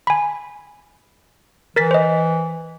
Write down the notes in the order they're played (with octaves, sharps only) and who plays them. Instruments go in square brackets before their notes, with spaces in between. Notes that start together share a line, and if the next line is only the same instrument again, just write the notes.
[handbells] G#5 B5
[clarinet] E3 [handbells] A#4 A6 B6
[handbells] C5 D#5